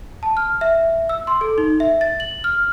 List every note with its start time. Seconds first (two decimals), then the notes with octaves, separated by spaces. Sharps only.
0.23 A5
0.37 F6
0.61 E5
1.09 E6
1.27 C6
1.41 A4
1.58 D#4
1.80 E5
2.01 A6
2.20 F#7
2.44 F6